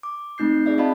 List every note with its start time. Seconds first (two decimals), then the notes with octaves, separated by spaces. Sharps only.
0.03 D6
0.38 A3 C4 D#4 G6 C7
0.66 G#4 D5 E5
0.78 C4 F4 D#5 F5 A5 B5